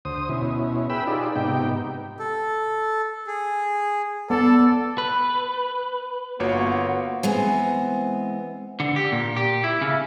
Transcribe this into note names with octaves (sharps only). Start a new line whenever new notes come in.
D2 C5 D#6
B2 C#4 E4
G#4 B4 G5 B5 E6
D#4 F4 G4 G#4 D5
G#2 C3 B3 D#4 G4 G5
A4
G#4
B3 A4 D5
B4
G1 A#3 B3 F4 F#4 C#5
E3 G#3 B3 C4
D3
G4
A#2
G4
E4
C#3